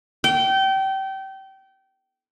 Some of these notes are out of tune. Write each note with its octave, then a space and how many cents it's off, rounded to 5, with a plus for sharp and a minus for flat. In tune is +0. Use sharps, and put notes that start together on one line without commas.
G5 -25